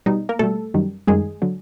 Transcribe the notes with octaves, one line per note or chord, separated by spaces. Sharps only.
B2 G3 D#4
A#3 A#4
B2 G3 A3 A4
F#2 D#3 G3
F#2 D#3 G3 G#3 G#4
D3 F#3